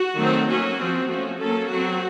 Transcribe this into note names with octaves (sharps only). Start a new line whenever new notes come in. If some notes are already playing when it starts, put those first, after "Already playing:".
Already playing: F#4
D#3 F#3 A3 C4
F#3 A#3 C#4 F#4
F3 C4
F3 A3 C#4 F#4
F#3 A#3 C#4 A4
F#3 C4 F#4